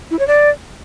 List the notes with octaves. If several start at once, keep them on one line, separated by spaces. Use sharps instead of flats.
E4
C#5
D5